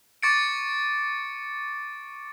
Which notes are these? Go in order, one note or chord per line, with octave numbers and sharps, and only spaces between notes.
C#6 D6 A6 C#7 D7